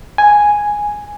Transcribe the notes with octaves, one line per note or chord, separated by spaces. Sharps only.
G#5